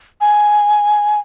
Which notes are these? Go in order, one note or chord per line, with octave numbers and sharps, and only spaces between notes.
G#5